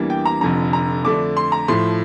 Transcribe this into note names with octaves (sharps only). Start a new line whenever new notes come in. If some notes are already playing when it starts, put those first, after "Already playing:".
Already playing: E2 E3 G3 A#3 D4
G5
A#5
F1 F2 D3 A#5
A#5
F2 D3 A3 D4 D6
C6
A#5
A2 F3 A3 C6